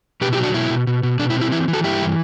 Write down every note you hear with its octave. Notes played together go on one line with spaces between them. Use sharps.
B2 G4 B4
E4 G4
F#3
D4 F#4
B2 E4
B2
B2
B2
B2 D4
E4
C4
E4
E3 E4
E3
F#4 A4
G2 E4 G4
E3